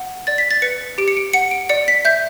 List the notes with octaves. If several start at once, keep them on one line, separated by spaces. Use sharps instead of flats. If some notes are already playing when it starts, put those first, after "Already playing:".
Already playing: F#5
D5 A6
B6
A6
B4 C#7
G4 D7
C#7
D7
F#5 C#7
D7
D5 C#7
B6
E5 G6